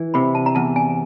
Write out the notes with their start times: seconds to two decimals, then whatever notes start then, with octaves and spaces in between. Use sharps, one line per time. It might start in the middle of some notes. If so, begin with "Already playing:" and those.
Already playing: E3
0.14 C3 B5
0.35 A5
0.46 A#5
0.55 E2 A5
0.76 G#5